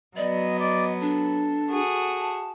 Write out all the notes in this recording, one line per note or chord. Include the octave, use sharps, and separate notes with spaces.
F#3 B3 D5 D#5
D5 D#5
D4 A4
F#4 G#4
A5